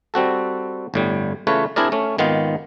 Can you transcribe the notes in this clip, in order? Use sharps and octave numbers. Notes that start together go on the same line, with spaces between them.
G3 C4 F#4 A4
G1 A2 G3
C#3 E3 A3 F4 B4 C#5
C4 D4 E4 G#4 A#4 D5
A3 C#4
G#1 D#3 B3 F4 F5